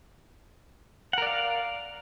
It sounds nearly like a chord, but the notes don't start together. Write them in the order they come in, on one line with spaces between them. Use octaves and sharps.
F#5 A#4 D5 F5